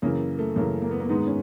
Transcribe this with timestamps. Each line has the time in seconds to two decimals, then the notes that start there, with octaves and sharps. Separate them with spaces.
0.02 F#2 C#3 E3 A#3
0.39 A3
0.56 F#2 C#3 E3 A#3
0.82 A#3
0.91 B3
1.00 A#3
1.09 G#2 D#3 G#3 B3
1.27 C#4